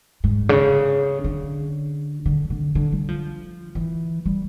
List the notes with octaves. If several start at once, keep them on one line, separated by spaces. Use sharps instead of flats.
G#2
C#3
D3
D3
D3
D3
G3
F3
E3
G3